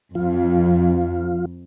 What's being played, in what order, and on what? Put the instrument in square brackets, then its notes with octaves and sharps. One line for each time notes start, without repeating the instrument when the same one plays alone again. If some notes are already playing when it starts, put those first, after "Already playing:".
[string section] F2 [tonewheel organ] F3 F4